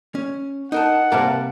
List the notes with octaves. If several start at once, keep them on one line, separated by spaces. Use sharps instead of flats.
C#4
D#4 A#4 F#5 A5
C3 G3 A#3 A#4 B4 A5